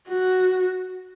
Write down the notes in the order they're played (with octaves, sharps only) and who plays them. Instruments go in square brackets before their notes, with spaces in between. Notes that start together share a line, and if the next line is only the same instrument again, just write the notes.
[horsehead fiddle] F#4